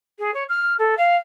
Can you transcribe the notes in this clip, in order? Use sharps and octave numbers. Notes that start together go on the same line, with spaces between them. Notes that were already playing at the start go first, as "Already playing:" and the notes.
G#4
C#5
F6
A4
F5